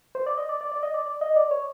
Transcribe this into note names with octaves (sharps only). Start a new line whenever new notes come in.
C5
D5
D#5
D5
D5
D5
D#5
D5
D5
D#5
D5
C#5